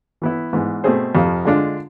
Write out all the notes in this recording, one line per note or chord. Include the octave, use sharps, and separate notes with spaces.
E3 B3 E4
G#2 E3 B3
B2 A3 C4 G#4 C5
F2 C3 F3
D3 G#3 D4 F4